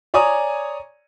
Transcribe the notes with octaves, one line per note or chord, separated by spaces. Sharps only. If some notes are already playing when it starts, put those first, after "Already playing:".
C#5 D5 G#5 A#5 C#6 D#6